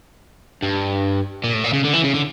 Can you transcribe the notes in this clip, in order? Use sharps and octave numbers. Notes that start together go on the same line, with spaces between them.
G2
A#2
A2
A#2
C#3
D3
E3
C#3
D3